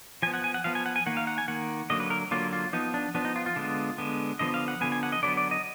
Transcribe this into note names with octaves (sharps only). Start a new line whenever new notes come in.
F3 B3 G#5
F#5
G#5
F#5
F3 B3 F5
G#5
F#5
G#5
D#3 A#3 F#5
F5
F#5
G#5
D#3 A#3 F#5
D3 F#3 A#3 D#5
B4
A#4
D3 F#3 A#3 F4
F4
F3 B3 D#4
D4
F3 B3 D4
D#4
F4
F4
D3 G#3 B3
D3 G#3 B3
D3 F3 B3 D#5
F5
F#5
D3 F3 B3 G#5
G#5
F#5
D#5
D3 F#3 B3 D5
D5
D#5